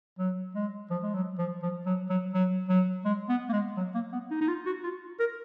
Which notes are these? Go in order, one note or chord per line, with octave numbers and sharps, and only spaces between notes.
F#3
G#3
F3
G#3
F#3
F3
F3
F#3
F#3
F#3
F#3
G#3
B3
A#3
G#3
F#3
A#3
B3
D#4
D#4
F4
F#4
F4
A#4